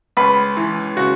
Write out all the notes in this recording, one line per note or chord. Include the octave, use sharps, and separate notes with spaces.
C#2 B4
E3
C#3 F#4